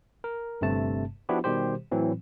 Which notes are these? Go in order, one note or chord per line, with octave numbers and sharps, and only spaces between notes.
A#4
G1 G2 C3 A3 A5
F3 B3 D4 E4 F#4 G4
B2 D#3 G3 G4 C5
A2 E3 F#3 C4